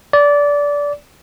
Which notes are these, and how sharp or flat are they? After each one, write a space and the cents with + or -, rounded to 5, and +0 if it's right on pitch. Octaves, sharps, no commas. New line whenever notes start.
D5 -20